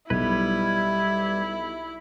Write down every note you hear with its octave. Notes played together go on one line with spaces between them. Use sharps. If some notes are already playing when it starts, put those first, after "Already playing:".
B1 G3 E4 B4 G#6